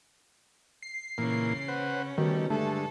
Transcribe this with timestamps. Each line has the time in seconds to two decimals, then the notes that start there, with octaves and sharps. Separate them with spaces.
0.82 C7
1.18 A#2 C#3 E3 A#3 C#4
1.68 B4 C5 F#5
2.18 B2 D#3 G3 A3
2.50 G2 D3 G#3 A3 A4